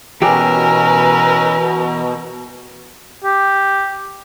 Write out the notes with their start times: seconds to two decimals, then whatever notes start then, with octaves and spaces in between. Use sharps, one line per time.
0.22 B2 E3 C#4 G4 G#4 A#4 B4 E6
3.24 G4